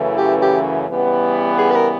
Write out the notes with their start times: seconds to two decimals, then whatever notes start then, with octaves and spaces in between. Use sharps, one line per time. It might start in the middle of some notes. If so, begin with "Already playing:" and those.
Already playing: F#2 C#3 E3 A3
0.18 G4
0.42 G4
0.88 C#3 E3 G3 B3
1.58 G#4
1.71 B4
1.75 A#4